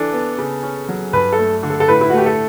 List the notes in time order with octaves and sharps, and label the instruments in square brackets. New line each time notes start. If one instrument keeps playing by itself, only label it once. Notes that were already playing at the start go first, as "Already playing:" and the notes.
Already playing: [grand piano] E3 D4 [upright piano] A4
[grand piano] B3
C#3
C#4
F#3
[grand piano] G2 [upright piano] B4
[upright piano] A4
[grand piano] A3
D3
[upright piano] A4
A4
[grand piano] A2 [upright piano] B4
[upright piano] E4
F#4
[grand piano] A3 [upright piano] G4
[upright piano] A4